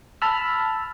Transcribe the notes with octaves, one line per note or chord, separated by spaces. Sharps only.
A5 B5 E6 F6